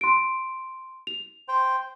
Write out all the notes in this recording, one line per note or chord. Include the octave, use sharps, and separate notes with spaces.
C6 D7
F7
C5 G5